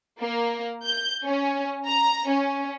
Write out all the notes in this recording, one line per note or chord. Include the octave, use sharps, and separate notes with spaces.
A#3
G6
C#4
A#5
C#4